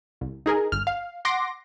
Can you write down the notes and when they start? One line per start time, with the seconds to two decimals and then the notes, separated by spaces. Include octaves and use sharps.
0.21 C2
0.46 D#4 G#4 A#4
0.72 G1 F6
0.87 F5
1.25 F#5 C6 D6 A#6